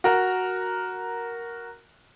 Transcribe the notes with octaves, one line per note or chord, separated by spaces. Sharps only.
F#4 A#4